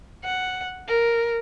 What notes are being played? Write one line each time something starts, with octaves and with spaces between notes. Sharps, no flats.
F#5
A#4